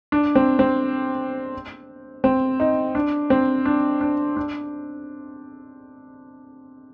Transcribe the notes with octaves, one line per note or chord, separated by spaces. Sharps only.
D4
C4
C4
C4
D#4
D4
C4
D4
D4
D4